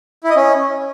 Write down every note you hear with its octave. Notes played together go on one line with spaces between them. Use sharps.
E4
D#5
C#4